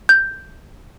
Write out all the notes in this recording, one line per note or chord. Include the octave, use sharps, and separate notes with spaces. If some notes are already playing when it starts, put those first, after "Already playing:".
G6